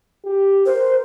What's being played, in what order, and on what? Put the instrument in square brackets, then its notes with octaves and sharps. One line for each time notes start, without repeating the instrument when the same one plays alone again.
[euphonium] G4
[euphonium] A#4 [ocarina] C5